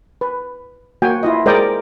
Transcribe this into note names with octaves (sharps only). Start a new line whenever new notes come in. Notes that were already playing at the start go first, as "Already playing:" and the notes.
B4
A#3 F#4 G5 G#5
E4 F4 D#5
G#3 A#4 C5 D5 D#5 G5